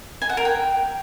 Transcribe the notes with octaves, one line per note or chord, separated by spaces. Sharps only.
G#5
F#5
A#4
G5